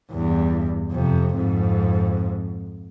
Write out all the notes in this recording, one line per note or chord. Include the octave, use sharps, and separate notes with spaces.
E2 G2
F2 C3
F2 G#2